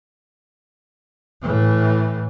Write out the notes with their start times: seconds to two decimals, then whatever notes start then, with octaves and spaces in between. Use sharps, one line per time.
1.42 A2 E3